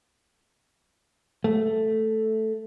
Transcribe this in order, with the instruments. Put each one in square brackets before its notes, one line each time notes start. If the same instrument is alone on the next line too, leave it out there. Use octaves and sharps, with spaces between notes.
[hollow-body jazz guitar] A3